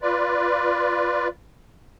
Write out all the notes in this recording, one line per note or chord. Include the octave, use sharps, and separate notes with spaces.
F4 B4 D5